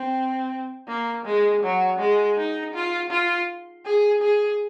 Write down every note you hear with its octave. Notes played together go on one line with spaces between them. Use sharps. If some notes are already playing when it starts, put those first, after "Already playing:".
Already playing: C4
A#3
G#3
F#3
G#3
D#4
F4
F4
G#4
G#4